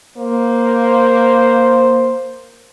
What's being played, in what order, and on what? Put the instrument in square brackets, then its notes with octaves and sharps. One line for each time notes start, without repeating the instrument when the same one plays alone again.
[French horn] A#3 [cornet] C5